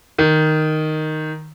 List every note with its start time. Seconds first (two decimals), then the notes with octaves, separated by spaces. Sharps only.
0.18 D#3